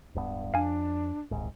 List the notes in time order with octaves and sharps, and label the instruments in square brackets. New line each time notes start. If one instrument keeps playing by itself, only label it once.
[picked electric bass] D1 G2 B3
[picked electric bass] F2 [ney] D4 [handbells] F5 G#5
[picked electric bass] D#1 C2 G#2